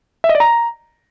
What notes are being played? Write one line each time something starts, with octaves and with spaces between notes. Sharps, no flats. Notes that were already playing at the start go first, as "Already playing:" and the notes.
E5
D#5
D5
A#5